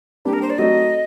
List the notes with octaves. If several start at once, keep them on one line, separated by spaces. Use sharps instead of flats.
G3 A#3 D4 G4
A#4
C5
D5
F#3 A3 C4 D#4 F#4 D#5